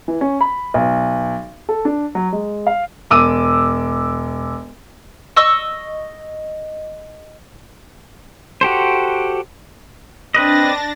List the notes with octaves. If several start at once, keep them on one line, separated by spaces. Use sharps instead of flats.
E3
C#4
B5
B1
A4
D4
F#3
G#3
F5
E1 D6 E6 D#7
D#5 C#6 E6
F#4 G4 A4 C5
C4 D4 B4 D#5 A6 A#6